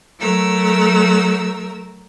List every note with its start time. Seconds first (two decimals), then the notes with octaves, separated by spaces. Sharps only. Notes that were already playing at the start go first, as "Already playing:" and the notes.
0.20 F#3 A3 A#4 E6